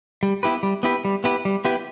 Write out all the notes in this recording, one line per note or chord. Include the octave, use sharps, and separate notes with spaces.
G3
B3 E4 G4 B4
G3
B3 E4 G4 B4
G3
B3 E4 G4 B4
G3
B3 E4 G4 B4